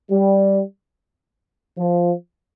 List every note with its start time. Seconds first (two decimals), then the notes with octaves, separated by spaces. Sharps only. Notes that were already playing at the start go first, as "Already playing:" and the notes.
0.10 G3
1.78 F3